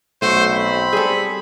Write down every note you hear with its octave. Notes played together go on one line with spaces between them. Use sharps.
B1 A3 F#4 C5
C4 B5
G3 G#4 A4